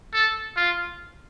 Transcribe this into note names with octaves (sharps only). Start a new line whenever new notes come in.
A4
F4